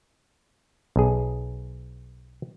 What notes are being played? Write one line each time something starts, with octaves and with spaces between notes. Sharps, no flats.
B1 G#4